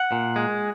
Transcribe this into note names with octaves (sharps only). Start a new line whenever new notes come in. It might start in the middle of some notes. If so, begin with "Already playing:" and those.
Already playing: F#5
A#2
G#3